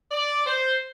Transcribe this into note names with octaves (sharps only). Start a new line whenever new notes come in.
D5
C5